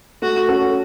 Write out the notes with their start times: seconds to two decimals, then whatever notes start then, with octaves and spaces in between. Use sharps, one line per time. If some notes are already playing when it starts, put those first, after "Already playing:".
0.22 A3 F#4
0.49 C#4 F#4 A4